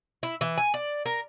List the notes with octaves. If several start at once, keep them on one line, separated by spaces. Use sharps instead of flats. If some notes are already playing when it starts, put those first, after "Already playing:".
E4
E3
G#5
D5
A#4